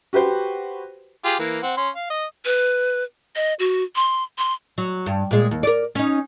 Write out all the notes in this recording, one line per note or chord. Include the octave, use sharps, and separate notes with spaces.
F#4 G4 B4 C5 G5
F4 G4 G#4
E3 A#3
C4 F#5
C#4 C6
F5
D#5
B4
D#5
F#4
C6
C6
F#3
G2
A#2 G#3
D#2
A#4 D5
C#4 D#4